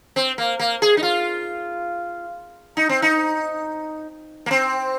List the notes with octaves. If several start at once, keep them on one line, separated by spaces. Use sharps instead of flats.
C4
A#3
A#3
G#4
D#4
F4
D#4
C4
D#4
A#3
C4